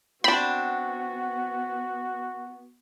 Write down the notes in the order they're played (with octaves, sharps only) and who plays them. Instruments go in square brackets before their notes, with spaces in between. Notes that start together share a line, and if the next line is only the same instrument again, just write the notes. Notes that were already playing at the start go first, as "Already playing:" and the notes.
[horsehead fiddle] B3 [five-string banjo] C4 D4 [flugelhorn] F#4 [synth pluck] B5